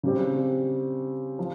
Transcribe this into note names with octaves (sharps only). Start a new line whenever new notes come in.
C#3 G3 C4
F3